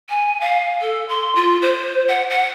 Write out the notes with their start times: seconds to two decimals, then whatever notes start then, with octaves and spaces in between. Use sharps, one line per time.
0.09 G#5
0.41 F5
0.81 A4
1.09 C6
1.35 F4
1.62 C5
2.08 F#5
2.30 F#5